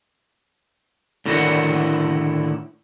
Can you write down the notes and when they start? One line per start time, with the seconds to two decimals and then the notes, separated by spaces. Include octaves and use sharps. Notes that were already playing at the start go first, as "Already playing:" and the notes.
1.26 A2 D3 D#3 E4 F#4